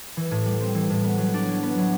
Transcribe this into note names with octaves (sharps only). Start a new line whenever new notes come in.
E3
A2
G3
C4
E3
A2
B3
F#3
D4
F#3
B3
F#3